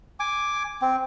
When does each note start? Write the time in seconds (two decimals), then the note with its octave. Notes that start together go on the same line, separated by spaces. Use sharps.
0.20 G#5 D6
0.82 C4